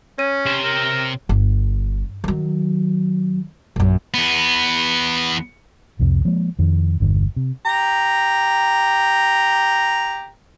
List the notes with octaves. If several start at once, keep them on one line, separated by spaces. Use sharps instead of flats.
C#4 C#5 D#7
C3 C5
A#4
G1
D#3 F#3
A#1 F#2
E2 B3
C2 F2 C3
F3 G#3 A#3
F2 D#3
G1 E2 G2 D3
C3
G4 A#5